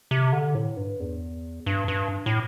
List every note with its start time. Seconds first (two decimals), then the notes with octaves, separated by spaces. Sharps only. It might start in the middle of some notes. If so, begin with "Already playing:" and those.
0.11 C3
0.33 D3
0.55 A2
0.77 G2
1.00 E2
1.66 G2
1.88 G2
2.26 A2